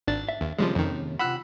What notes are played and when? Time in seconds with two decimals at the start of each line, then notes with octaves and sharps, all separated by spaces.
0.08 G#1 D4 A6
0.29 E5
0.41 D#2
0.58 D#2 C3 F3 G3 G#3 C#4
0.75 F2 D#3
1.19 C3 F4 F#5 B5 E6 F#6